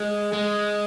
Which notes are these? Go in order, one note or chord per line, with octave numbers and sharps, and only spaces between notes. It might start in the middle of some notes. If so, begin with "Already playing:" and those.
Already playing: G#3
G#3